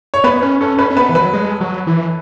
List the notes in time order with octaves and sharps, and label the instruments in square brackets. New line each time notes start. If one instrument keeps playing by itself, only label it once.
[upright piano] C#5
[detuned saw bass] B3 [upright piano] B4
[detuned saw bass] C#4 [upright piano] B4
[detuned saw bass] C#4 [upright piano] A4
[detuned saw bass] C#4 [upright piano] B4
[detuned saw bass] C#4
[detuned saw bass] B3 [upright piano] B4
[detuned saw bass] E3
[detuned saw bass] F#3 [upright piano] B4
[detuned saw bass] G#3
F#3
E3